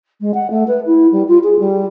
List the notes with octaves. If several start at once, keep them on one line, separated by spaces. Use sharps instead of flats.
G#3
F#5
A3
B4
E4
G3
F4
G#4
G3